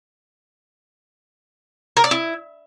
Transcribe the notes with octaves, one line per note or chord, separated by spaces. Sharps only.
A#4
D5
E4